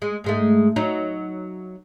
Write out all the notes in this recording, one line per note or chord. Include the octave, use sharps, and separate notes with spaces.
G#3
G#2 G#3 A3
F#3 D#4